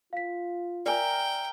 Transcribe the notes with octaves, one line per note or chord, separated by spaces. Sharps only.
F4 F5 B6
A#4 D5 E5 G5 G#5 A#5